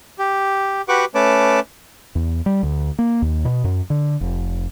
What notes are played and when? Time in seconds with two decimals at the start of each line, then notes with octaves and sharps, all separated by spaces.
0.19 G4
0.88 F#4 G4 B4 F#5 C#6 D6
1.15 A3 C#4 B4 C#5 A5 D6
2.15 E2
2.46 G3
2.63 D2
2.99 A#3
3.22 D#2
3.45 B2
3.64 F#2
3.90 D3
4.21 F1